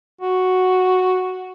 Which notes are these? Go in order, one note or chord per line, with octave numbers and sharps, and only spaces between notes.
F#4